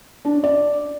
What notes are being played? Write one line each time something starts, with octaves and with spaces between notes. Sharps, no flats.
D4
C#4
D5